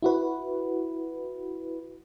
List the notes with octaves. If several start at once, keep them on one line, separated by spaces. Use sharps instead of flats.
E4 F#4 B4